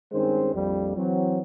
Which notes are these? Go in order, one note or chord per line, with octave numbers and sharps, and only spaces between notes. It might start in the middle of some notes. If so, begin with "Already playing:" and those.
G2 D#3 G#3 C4 C#4 C5
A#1 F2 G3
E3 F#3 C4